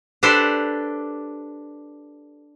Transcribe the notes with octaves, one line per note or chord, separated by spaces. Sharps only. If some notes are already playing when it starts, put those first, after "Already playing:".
D4 G4 A4 B4 C5 D5